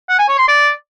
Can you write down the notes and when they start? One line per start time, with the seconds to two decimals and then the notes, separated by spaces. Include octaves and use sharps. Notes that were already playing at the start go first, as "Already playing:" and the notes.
0.09 F#5
0.19 G#5
0.28 C#5
0.38 C6
0.48 D5